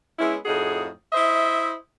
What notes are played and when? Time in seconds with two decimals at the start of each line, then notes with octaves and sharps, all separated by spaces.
0.19 G#3 B3 C#4 E4
0.45 F2 A2 D#4 F#4 G#4
1.13 E4 C5 D#5 E5